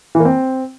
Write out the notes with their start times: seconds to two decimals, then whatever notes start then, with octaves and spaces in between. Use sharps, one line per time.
0.15 E3
0.20 A#3
0.25 C4